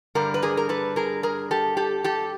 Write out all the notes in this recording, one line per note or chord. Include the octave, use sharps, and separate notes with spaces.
G2 D3 G3 A#4
B4
G#4 A#4
A#4
A4 B4
G#4 A#4
G#4 A#4
G4 A4
G4 A4
G4 A4